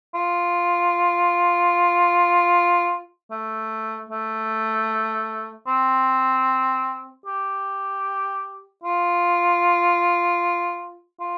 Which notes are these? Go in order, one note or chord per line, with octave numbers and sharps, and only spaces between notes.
F4
A3
A3
C4
G4
F4
F4